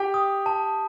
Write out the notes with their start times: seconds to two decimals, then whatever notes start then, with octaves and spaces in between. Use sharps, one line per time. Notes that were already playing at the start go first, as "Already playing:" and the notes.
Already playing: G4 G5
0.14 D#6
0.46 A5